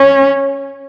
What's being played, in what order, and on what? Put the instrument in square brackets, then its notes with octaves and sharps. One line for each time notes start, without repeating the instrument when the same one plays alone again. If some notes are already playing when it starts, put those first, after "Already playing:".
Already playing: [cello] C#4